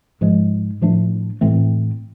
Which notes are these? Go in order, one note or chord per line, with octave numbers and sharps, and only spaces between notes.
G#2 F3 G#3
A2 F3 A3 D4
A2 E3 A3 C4